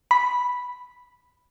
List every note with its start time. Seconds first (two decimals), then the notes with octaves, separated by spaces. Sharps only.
0.11 B5